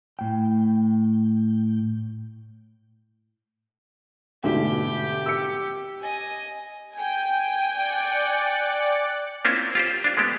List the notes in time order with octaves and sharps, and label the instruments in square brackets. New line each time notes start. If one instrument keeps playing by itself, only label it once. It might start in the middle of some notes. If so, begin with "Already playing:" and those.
[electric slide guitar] A2 G5
[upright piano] D2 G#2 B2 [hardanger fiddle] G4
[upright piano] E6 C#7
[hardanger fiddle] D#5 G#5
[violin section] G5 G#5
[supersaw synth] D5 F#6 C#7
[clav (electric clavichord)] A#3 C4 C#4 E4 F4 C5
F4 G4 C5
D4 F4
G#3 A3 B3 G4